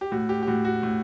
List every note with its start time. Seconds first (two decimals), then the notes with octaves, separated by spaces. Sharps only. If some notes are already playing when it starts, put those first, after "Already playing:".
0.01 G4
0.11 A2 F#4
0.29 G4
0.43 G4
0.47 A2 F#4
0.65 F#4
0.83 A2